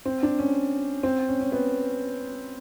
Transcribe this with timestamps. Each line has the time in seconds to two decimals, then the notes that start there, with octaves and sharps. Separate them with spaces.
0.05 C4
0.23 D4
0.39 C#4
1.03 C4
1.28 C#4
1.40 C#4
1.52 B3